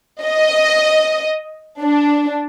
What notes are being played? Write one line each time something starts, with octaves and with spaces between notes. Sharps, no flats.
D#5
D4